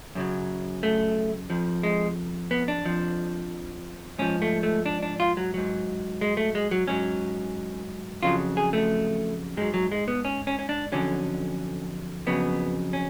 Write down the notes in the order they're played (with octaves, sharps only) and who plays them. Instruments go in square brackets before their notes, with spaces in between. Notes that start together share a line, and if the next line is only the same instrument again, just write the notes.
[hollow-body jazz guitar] F#2 C#3 F#3
A3
F2 F3
G#3
B3
D4
F2 F3
G#2 F3 C#4
A3
A3
D4
D4
F4
F#3
G#2 F#3
G#3
A3
G#3
F#3
G#2 F#3 C#4
F2 C#3 F#3 F4
G#4
A3
G#2 F#3 G#3
F#3
G#3
B3
C#4
C#4
C#4
D4
F2 D3 F#3 C#4
F2 C#3 F#3 B3
C#4